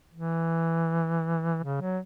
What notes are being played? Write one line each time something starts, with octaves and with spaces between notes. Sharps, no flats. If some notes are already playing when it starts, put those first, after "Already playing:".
E3
C#3
F#3